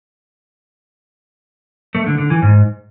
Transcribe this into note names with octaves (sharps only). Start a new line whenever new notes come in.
A3
D3
D3
E3
G#2